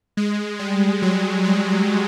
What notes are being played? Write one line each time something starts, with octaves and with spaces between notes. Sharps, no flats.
G#3
G3
F#3
G3